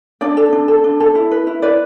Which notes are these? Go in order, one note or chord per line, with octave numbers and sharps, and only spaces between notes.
D4 D5
A4
D4
A4
D4
A4
E4
B4
E4
B4 D5